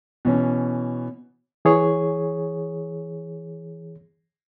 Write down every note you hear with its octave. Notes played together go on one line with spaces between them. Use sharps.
B2 E3 C#4
E3 G#4 C#5